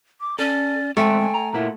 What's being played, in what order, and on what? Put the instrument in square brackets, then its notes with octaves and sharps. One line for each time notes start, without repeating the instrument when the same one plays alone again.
[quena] D6
[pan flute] C#4 [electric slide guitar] A4 [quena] D5
[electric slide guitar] G#3 C4 D5 [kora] A3 [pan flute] G5 [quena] G#5
[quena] G#5
[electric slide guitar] A#5
[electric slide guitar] A#2 A#3 E4 [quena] F#5